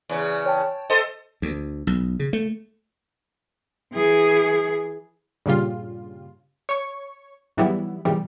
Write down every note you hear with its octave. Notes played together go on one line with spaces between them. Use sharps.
E2 C#3
C#5 G5 A5
A4 C5 D#5
D2
B1
C#3
A3
E3 G#4
G2 A#2 C#3 G3 F4
C#5 C#6
G#2 E3 F#3 G3 B3 E4
G#2 B2 D#3 E3 G3